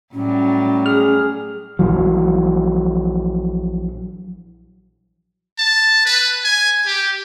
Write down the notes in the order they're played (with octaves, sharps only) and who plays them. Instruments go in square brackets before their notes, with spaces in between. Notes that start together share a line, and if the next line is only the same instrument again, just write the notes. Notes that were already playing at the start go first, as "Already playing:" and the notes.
[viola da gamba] A2 F#3 G3 [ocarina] C#4
[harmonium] G#4 [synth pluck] F6
[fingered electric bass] A#1 E3 F#3
[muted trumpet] A5
B4
G#5
G4